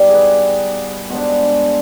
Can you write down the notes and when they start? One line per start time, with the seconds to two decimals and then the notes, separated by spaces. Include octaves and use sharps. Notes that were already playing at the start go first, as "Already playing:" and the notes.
Already playing: B2 G3 B3 D#4 D5
0.09 G#4 B4
1.10 B2 G#3 B3 D4 C5